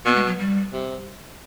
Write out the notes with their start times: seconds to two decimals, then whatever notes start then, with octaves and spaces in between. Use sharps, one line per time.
0.06 B2 B3
0.16 G#3
0.27 F#3
0.39 G3
0.73 C3